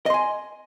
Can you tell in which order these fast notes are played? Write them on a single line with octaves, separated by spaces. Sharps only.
D#5 C6 G#5